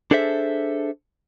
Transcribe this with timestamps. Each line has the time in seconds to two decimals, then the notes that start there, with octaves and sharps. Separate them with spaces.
0.11 D4 G#4 A4 C5 E5